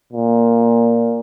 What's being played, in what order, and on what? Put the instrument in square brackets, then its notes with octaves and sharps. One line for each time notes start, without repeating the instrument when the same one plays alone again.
[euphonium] A#2